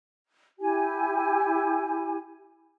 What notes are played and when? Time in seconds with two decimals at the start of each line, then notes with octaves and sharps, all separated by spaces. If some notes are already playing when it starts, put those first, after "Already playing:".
0.60 E4 G4 G#5